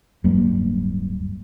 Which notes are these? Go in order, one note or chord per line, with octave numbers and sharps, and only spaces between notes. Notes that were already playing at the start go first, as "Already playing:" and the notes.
D1 G2 F#3 A#3